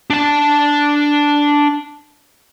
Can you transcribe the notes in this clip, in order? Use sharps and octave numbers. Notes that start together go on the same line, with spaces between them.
D4 A5